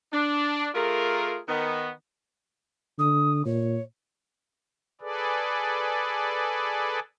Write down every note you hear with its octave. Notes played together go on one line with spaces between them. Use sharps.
D4
A3 F4 G#4 A#4
D#3 B3
D3 D#6
A#2 C#5
G#4 A4 B4 D5